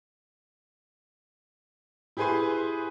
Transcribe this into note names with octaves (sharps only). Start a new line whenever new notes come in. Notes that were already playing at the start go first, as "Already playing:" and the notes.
E4 G4 G#4 B4 G#5 C6